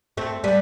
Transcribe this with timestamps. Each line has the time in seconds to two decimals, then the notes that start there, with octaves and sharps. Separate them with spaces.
0.17 A3 C4
0.44 G3 B3